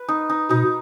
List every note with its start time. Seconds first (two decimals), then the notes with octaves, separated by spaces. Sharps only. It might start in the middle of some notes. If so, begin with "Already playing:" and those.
Already playing: B4
0.09 D#4
0.30 D#4
0.50 B2 D#4